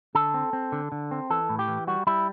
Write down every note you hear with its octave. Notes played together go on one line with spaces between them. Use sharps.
D3 A4
C4
C4
D3
D3
C4
E3 A4
A2
G4
E3
G3 F#4
G3 E4